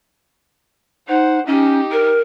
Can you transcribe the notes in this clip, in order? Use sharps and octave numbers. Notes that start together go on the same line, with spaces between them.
D#4 C5 F#5
C#4 D#4 G4
A#4